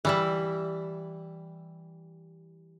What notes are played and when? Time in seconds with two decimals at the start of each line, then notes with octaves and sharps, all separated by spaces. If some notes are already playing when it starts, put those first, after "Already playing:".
0.05 E3 G3 E4